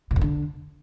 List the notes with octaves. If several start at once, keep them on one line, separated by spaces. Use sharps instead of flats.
B2
F2
D3